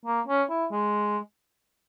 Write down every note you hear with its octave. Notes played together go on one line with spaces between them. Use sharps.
A#3
C#4
E4
G#3